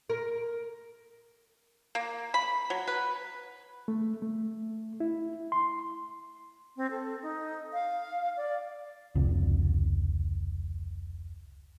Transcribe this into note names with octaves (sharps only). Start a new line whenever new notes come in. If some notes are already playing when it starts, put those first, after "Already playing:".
A#4
A#3
B5
F#3
B4
A3
A3
E4
C6
C4
A4
D#4
F5
D5
F1 C#2